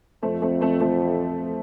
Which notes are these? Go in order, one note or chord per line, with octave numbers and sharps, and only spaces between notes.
F2 A3 C4
A3 C4
A3 C4
F3 A3